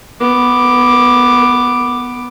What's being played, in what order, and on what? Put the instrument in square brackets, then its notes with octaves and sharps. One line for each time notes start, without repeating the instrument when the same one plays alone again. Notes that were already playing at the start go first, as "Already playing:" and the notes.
[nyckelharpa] B3 D6